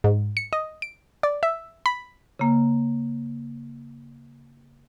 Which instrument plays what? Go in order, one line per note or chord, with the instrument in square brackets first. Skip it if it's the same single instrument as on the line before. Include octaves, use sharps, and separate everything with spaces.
[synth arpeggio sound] G#2
C#7
D#5
D7
D5
E5
B5
[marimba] C#3 A#3